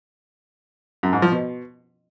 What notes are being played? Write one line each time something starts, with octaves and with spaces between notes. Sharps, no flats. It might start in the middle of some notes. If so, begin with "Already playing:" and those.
F#2
G#2
F3
B2